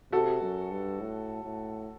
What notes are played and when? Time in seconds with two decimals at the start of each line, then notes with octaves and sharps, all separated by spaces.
0.12 C3 F#4 A4
0.41 F#2
0.71 G2
1.00 A2
1.44 A2